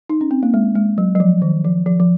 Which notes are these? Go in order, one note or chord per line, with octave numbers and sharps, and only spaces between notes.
D#4
C#4
C4
A#3
G#3
G#3
F#3
F#3
F3
D#3
F3
F3
F3